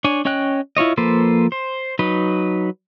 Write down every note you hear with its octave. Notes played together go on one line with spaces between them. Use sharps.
D4 C#5 G#5
C#4 C#5 D#5 G5 F#6
E4 F4 C#5 D#5
F3 A#3 A4 B4 C5
C5
F#3 D#4 B4